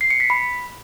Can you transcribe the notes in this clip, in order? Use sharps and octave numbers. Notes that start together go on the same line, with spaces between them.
C7
C#7
B6
B5